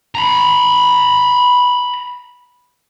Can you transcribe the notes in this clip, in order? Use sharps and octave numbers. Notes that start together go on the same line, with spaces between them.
A#5 B5